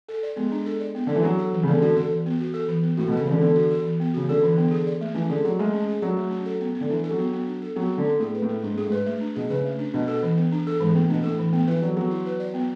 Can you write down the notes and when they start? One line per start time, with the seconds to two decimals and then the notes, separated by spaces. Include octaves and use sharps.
0.09 A4
0.23 D5
0.36 G#3 B3
0.52 D4
0.66 A4
0.80 D5
0.95 B3
1.07 D3 D4
1.15 E3
1.23 F#3 F#4
1.39 A4
1.53 E3
1.63 C#3
1.67 D3 B3
1.82 D3 F#4
1.96 D3 A4
2.11 E3
2.26 B3
2.40 F#4
2.54 A4
2.69 E3
2.83 B3
2.97 A2 F#4
3.08 B2
3.13 A4
3.20 C#3
3.27 D3 E3
3.41 D3 B3
3.56 F#4
3.71 A4
3.85 E3
4.00 B3
4.14 C#3 F#4
4.29 D3 A4
4.43 E3
4.58 B3
4.71 G#4
4.87 D5
5.01 A3
5.15 E3 C#4
5.30 D3 G#4
5.45 F#3 D5
5.59 G#3 A3
5.74 C#4
5.88 G#4
6.02 F#3 D5
6.17 A3
6.31 C#4
6.46 A4
6.60 B3
6.75 B3
6.81 D3
6.90 E3 D4
7.04 A4
7.11 F#3
7.19 B3
7.33 B3
7.47 D4
7.62 A4
7.76 F#3 B3
7.91 B3
7.98 D3
8.05 D4
8.20 A2 G#4
8.35 B4
8.42 A2
8.49 A3
8.63 G#2 D4
8.75 A2 G#4
8.86 G#2
8.92 B4
9.06 A3
9.21 D4
9.36 B2 G#4
9.50 C#3 B4
9.65 A3
9.79 D4
9.94 B2 D4
10.08 A4
10.23 E3
10.37 B3
10.52 D4
10.67 A4
10.80 G#2 E3
10.95 A2 B3
11.09 B2 D4
11.24 A2 A4
11.39 E3
11.53 B3
11.68 E3 B4
11.82 F#3 D5
11.96 F#3 B3
12.11 E4
12.26 B4
12.40 D5
12.54 B3